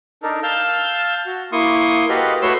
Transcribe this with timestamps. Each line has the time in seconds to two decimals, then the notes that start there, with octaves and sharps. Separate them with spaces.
0.23 D4 D#4 A4 A#4
0.43 F5 A5 E6 F6 G6
1.26 F#4
1.52 A#3 E4 C6 C#6 D#6
2.09 F#4 G4 A4 B4 D#5 F5
2.42 A3 F#4 B4 C#5 C6 E6